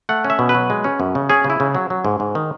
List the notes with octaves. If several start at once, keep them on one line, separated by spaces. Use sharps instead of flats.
A3 F#5
C#4
E5
B2
B4
F#3
G#3
C#4
F#2
C#3
C#4 G#4
C#3
E4
C#3
F#3
F#3
G#2
G#2
D#3